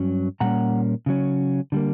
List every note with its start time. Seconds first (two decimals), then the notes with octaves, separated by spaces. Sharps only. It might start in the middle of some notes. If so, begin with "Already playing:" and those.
Already playing: G2 F#3 C#4
0.40 A#2 G3 A#3 C#4 F#5 A#5
1.06 C#3 F#3 C#4
1.72 D3 G3 A#3